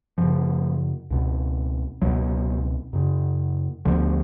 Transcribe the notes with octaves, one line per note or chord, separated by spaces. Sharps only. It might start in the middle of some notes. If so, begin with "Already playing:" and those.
F#2 C#3 F3
C#2 B2
C#2 B2 F#3
F#2 C#3
D2 D3 F3